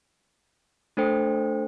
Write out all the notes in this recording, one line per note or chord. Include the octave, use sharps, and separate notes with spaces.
A3 D4 A4 C5 G5